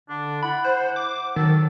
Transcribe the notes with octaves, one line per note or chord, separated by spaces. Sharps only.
D3 D4
E4 F#5 B5
C5
D6
D#3 F#3 A4